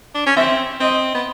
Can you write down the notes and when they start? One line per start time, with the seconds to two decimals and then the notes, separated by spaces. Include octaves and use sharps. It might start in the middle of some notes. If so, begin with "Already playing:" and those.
0.15 D4
0.26 C#4
0.37 C4 E5
0.80 C4 D#5
1.14 B3